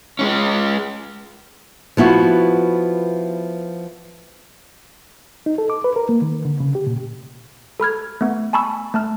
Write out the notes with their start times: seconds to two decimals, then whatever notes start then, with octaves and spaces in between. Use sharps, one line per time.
0.19 G#3 C#4
1.97 F3 B3 E4 F#4
5.46 D#4
5.58 A4
5.70 D6
5.84 B4
5.96 A#4
6.09 A#3
6.22 D#3
6.45 D3
6.60 C#3
6.75 G4
6.87 A#2
7.80 A4 B5 F6 G#6
8.21 A3 B3
8.53 G#5 A5 B5 C#6 E6
8.94 A3 A5 F6